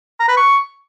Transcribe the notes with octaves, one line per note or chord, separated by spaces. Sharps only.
A#5
B4
C#6